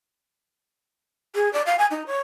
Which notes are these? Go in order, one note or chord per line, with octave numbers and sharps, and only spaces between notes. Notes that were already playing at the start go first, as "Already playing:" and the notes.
G#4
D5
F5
G#5
D#4
C#5